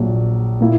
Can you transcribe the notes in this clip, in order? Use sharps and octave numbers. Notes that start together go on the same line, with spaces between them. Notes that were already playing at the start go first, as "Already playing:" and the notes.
Already playing: A#1 A#2 F#3
A#2 A#3 E4